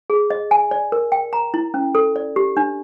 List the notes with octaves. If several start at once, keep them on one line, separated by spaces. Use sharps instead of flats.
G#4
D#5
G#5
D5
A#4
G5
A#5
E4
C#4
A4
D5
G4
D4